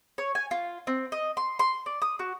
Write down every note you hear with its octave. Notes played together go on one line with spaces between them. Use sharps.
C#5
G#5
F4
C4
D#5
C6
C6
D5
D#6
F#4